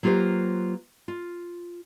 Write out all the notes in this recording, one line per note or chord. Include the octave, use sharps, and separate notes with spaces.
F#3 A#3 F4 G4 B4 C5
F4